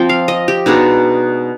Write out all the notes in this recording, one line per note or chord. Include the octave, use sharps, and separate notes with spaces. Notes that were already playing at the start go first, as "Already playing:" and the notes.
Already playing: F3 C4 G5
F5
D#5
G4
B2 G#3 D4 D#4